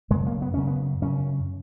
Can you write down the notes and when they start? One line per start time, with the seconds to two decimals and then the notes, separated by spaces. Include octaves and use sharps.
0.10 F#2 C#3 G#3
0.26 A#3
0.42 B3
0.54 F#2 C#3 C#4
0.67 B3
1.02 F#2 C#3 C#4